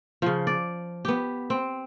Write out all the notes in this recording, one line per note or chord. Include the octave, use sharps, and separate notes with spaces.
C#3 F3
D5
B3 G4
C4